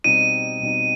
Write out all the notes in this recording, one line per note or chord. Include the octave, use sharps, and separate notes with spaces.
B2 G3 C4 D#4 D#7
B2 G3 C4 D#4